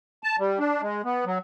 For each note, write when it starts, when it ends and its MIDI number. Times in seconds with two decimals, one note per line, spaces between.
0.24 0.36 81
0.39 0.59 55
0.59 0.82 62
0.82 1.02 56
1.05 1.25 59
1.26 1.38 54